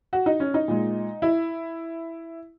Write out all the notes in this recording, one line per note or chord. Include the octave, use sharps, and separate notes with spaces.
F#4
D#4
C#4
D#4
A#2 G#3
E4